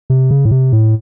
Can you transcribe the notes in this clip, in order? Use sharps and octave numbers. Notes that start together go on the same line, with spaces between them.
C3
C#3
A2
C3
A2